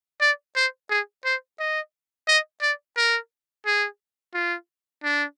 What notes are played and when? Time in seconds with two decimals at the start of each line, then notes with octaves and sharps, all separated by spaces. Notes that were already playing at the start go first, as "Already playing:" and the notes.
0.21 D5
0.56 C5
0.90 G#4
1.25 C5
1.59 D#5
2.28 D#5
2.61 D5
2.96 A#4
3.66 G#4
4.34 F4
5.03 D4